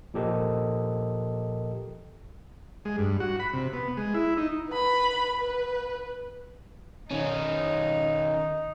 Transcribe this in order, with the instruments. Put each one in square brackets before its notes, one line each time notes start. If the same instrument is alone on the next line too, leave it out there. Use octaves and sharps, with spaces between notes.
[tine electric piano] A#2 F3 G4 A4 A#4 D#5
[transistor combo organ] G#3
G2
F#4
B5
C3
B3
G#3
E4
D#4
[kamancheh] B4 B5
B4
[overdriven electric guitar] D#3 C#4 [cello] D#4